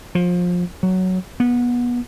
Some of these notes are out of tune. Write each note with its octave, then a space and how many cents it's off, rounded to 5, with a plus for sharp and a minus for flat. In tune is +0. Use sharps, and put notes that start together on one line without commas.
F3 +25
F#3 +5
B3 -25